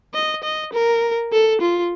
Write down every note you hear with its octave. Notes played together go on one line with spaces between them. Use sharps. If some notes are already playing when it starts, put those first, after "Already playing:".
D#5
D#5
A#4
A4
F4